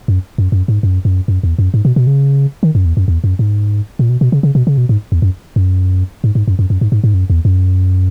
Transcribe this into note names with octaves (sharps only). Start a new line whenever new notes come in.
F#2
F#2
F#2
G#2
F#2
F#2
F#2
E2
F#2
G#2
B2
B2
C#3
D#3
F#2
E2
F#2
E2
F#2
G#2
A#2
B2
B2
C#3
C#3
B2
C#3
B2
G#2
E2
F#2
F#2
G#2
G#2
F#2
F#2
F#2
G#2
G#2
G#2
F#2
E2
F#2